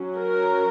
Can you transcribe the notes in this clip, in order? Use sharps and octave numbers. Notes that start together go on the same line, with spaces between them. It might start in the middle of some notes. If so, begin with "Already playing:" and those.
Already playing: F#3 C#4
A#4